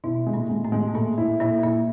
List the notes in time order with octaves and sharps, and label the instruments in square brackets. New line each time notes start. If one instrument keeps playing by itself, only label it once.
[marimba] B2 B3 [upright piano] E4
[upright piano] G#3
[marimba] A#2 A#3
[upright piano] G#3
[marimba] A2 A3
[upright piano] G#3
[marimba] B3
[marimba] A#2 A#3 [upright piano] A3
[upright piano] E4
[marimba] A#2 A#3 [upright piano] E4
[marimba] A#2 A#3 [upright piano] E4